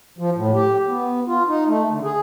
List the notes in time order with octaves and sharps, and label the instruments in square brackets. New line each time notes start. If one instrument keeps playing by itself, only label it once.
[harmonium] F3
A2
G4
B3
F4
D#4
A3
D3
G#4